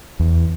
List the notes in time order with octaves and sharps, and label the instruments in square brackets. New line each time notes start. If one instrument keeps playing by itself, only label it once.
[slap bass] E2